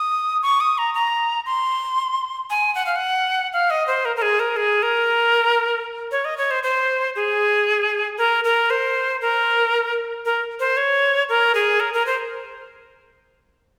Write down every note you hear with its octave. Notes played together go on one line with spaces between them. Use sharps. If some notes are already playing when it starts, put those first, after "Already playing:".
Already playing: D#6
C#6
D#6
A#5
A#5
C6
G#5
F#5
F5
F#5
F5
D#5
C5
A#4
A#4
G#4
A#4
G#4
A#4
C#5
D#5
C#5
C5
C5
G#4
A#4
A#4
C5
A#4
A#4
C5
C#5
A#4
G#4
A#4
A#4
C5